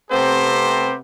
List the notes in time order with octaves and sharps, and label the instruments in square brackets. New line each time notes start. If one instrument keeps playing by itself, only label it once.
[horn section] C3 A3 B3 C4 G4 C5